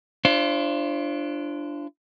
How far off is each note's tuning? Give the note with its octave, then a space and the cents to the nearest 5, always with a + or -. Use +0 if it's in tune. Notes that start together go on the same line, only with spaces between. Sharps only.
D4 +0 F4 -40 C5 +30